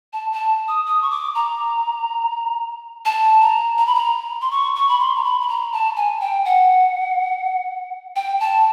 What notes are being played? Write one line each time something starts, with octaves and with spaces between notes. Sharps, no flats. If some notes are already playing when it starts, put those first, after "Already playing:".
A5
A5
D#6
D#6
C#6
D6
A#5
A5
A#5
A#5
B5
A#5
C6
C#6
C#6
B5
C6
A#5
B5
B5
A#5
A5
G#5
G5
F#5
G5
A5